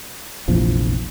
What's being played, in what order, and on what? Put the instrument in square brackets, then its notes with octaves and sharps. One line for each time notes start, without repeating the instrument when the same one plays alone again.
[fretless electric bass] F1 A#1 E2 F3